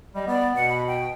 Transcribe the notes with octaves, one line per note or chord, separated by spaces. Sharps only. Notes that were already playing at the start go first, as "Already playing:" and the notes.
G3 D#5
B3 D5
B2 F#5
B5
G5